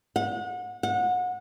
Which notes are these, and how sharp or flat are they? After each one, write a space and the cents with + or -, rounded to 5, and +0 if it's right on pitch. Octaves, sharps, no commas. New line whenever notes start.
F#5 -30
F#5 -30